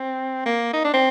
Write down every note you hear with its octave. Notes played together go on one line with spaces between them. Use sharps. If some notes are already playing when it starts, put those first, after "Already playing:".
Already playing: C4
A#3
D#4
D4
C4